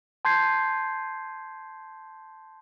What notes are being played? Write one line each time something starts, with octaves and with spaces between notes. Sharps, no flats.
A5 C6 G6 G#6 C7